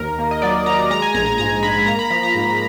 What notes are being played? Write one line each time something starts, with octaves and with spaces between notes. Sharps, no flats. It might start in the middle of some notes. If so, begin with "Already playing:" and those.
Already playing: D#2 A#4
A#3
D#5
F#3 D5
F#3 A#5
G#3 A#5
G#5
A#1 A#5
A#5
G#2 A#5
G#2 B5
A#3 A#5
B5
F3 A#5
A#5
G#2